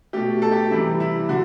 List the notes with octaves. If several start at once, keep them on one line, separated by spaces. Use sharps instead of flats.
B2 A3 G4
A4
G4
C3 E3 G3 E4
E4
D3 F#4